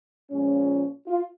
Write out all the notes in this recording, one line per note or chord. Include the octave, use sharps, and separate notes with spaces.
A#2 F3 G#3 C#4
F4